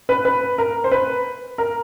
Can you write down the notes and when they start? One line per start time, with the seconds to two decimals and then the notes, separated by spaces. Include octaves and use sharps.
0.09 B4
0.25 B4
0.58 A#4
0.84 C5
0.91 B4
1.58 A#4